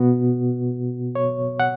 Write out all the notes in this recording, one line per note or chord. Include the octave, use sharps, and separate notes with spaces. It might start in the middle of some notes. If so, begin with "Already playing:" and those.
Already playing: B2 B3 F#4
C#5
F#5